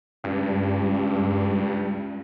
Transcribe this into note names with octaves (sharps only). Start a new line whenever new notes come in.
C#2 G2